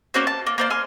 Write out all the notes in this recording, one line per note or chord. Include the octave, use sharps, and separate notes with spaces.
A#3 C#4 F#4 C5
A5
A#3
A#3 C5 D5
G#5 C6 F6